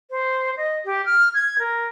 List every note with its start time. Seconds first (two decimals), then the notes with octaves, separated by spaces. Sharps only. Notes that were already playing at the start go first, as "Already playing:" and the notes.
0.11 C5
0.57 D#5
0.85 G4
1.06 F6
1.34 G#6
1.59 A#4